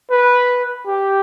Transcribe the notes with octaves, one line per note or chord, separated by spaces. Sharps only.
B4
G4